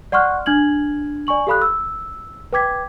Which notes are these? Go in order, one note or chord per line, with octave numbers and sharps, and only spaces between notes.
D5 F#5 C6 C#6 F6 F#6
D4 F6 G#6 F#7
D5 G#5 C#6 F#7
G4 A4 F5 B5 D#6 F#6
E6
B4 G5 D6 G#6 B6